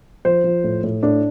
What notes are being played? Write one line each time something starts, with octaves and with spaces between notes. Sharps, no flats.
F3 C5
F3
A2
A2
A2 D4